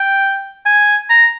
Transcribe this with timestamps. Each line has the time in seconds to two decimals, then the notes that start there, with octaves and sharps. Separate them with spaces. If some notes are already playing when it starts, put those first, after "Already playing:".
Already playing: G5
0.66 G#5
1.10 A#5